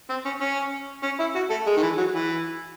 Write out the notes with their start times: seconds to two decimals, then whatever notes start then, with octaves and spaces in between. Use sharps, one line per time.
0.10 C4
0.25 C#4
0.41 C#4
1.03 C#4
1.20 E4
1.36 F#4
1.51 A3
1.67 G#3
1.77 D#3
1.83 E3
1.98 F#3
2.14 E3